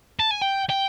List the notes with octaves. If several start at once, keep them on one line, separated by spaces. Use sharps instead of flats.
A5
G#5
G5
G5